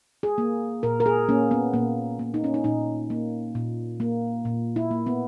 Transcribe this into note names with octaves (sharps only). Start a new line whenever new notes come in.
G#4
A#3
A#2 A#4
A#4
G#4
A#3 C#4
B3
A#2 A#3
A#3
D#4
C#4
D#4
A#2 D#4
A#3
A#2
A#3
A#2
E4
A#3
B3